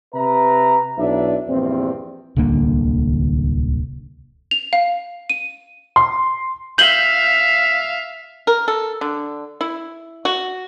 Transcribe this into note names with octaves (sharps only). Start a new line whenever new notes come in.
C3 B4 E5 A#5
B1 D4 E4 B4 D5 E5
A#1 E2 G2 C4
D1 C2 D3 A#3
F7
F5
D#7
C6
E5 F5 G6 F#7 G7
A#4
A4
D3
E4
F#4